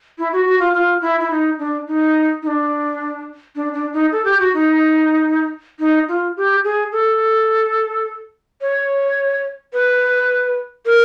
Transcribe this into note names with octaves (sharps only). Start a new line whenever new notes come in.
E4
F#4
F#4
F4
F4
E4
E4
D#4
D4
D#4
D#4
D4
D4
D4
D#4
A4
G4
F#4
D#4
D#4
F4
G4
G#4
A4
C#5
B4
A#4